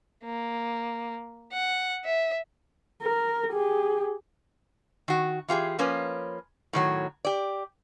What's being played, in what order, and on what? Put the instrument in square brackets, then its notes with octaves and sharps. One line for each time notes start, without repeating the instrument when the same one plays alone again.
[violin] A#3
F#5
E5
[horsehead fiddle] A#4
G4 G#4
[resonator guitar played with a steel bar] D#3 F#4
E3 F4 G4 G#4
F3 A#3 C#4 B4
A2 D#3 F#3
G4 D5